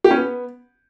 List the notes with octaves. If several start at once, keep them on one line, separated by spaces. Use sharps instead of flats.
G4
C#4
B3